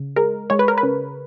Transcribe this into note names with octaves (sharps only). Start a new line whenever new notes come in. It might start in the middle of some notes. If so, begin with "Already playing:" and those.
Already playing: C#3
G#3 A#4
G#3 C#5
B4
A#4
B4
C#3